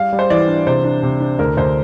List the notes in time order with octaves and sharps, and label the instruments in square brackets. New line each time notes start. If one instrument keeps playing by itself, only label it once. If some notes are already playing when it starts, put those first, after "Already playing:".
Already playing: [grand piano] G3 [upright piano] F5
[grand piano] G3
[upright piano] C5
[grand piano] E3 [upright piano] D5
[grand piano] D4
[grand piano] C3 [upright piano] C5
[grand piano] D4
C3
D4
[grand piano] D2 [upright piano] A#4
[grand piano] D2 [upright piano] C5